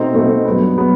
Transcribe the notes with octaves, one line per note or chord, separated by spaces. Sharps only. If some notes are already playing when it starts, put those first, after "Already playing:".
Already playing: B2 A3 C4 D#4
B2 A3 C4 D#4
G2 F#3 B3
F#3 B3